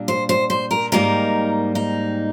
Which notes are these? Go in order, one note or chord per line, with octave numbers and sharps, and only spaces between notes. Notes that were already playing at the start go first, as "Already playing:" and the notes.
Already playing: A#2 G3 D4
C5
C5
C5
A#4
G#2 D#3 G3 A#3 D#4 A#4
D#4